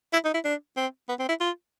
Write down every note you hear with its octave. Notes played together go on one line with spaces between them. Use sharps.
E4
D#4
E4
D4
C4
B3
C4
E4
F4